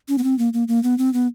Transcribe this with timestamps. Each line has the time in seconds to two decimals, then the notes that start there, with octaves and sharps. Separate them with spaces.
0.09 C#4
0.18 B3
0.24 C4
0.39 A#3
0.53 A#3
0.68 A#3
0.83 B3
0.98 C4
1.14 B3